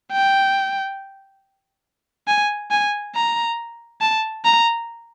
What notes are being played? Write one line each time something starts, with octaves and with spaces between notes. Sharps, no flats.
G5
G#5
G#5
A#5
A5
A#5